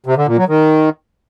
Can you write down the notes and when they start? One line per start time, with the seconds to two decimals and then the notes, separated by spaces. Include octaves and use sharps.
0.06 C3
0.17 D3
0.27 A#2
0.38 F#3
0.48 D#3